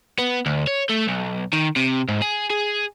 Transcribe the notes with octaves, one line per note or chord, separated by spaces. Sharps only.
B3
D2
C#5
A3
B1
D#3
C3
G#2
G#4
G#4